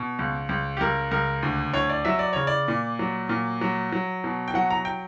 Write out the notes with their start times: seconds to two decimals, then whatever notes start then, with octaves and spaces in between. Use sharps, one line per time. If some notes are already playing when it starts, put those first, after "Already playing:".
Already playing: B2
0.19 C#2
0.49 C#2
0.77 G4
0.81 C#2 A#4
1.11 C#2 A#4
1.43 D2
1.74 D2 C#5
1.89 D5
2.05 F#3 E5
2.19 D5
2.33 C#3 C#5
2.47 D5
2.68 A#2
2.99 F#3
3.29 A#2
3.61 F#3
3.92 F#3
4.24 B2
4.48 G5
4.54 F#3 F#5
4.71 A#5
4.85 G5